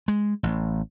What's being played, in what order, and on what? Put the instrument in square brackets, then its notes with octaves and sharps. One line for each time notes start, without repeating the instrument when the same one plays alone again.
[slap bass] G#3
A1